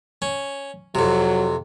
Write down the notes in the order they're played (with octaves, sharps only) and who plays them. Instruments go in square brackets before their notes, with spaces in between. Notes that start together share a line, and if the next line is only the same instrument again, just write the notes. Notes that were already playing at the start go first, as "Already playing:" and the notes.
[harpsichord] C#4
[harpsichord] F2 C3 [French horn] F#3